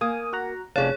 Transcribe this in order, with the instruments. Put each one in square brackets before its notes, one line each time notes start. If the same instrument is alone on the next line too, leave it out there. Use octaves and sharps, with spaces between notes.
[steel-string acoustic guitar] A#3 [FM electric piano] G#5 D#6
[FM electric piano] F#4 F#5 A#5
[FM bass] F1 [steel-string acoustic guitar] C#4 D5 F5 [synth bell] G#4 C#5 [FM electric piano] A5